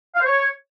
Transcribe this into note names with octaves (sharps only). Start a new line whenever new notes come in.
F5
C5
C#5